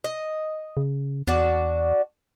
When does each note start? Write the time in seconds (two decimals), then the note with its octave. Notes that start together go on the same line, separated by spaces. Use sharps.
0.04 D#5
0.77 C#3
1.27 E2 D4 F#4 D5